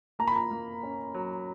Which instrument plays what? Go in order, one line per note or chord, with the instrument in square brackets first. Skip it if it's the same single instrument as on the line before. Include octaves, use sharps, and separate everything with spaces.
[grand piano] A#3 [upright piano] A#5
[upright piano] B5
A#5
[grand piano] A#3
C#4
F#3